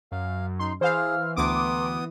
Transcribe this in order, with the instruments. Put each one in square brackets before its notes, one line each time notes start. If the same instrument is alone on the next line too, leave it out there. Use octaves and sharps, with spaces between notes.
[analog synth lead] F#2 [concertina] F5
[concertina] D#4 [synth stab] C6
[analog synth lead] E3 [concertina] G#4 [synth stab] C5 F5 [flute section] E6 F6
[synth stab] D2 D6 [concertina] B3 D#6 [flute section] G5 A#5 C6